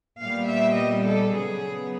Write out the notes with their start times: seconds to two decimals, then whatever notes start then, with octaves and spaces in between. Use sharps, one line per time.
0.20 A#2 G3 B3 F5
0.49 E5
0.77 D#5
1.05 A4
1.32 C#3 F#3 B3 G#4